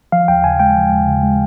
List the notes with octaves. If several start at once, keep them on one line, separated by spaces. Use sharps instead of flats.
F3 F5
D#2 G5
C#3 G#5
G#3 G5
F3
D#2
C#3
G#3